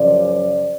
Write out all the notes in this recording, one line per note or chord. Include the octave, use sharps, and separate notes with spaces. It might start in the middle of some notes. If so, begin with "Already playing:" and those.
Already playing: F#2 C#3 F3 D5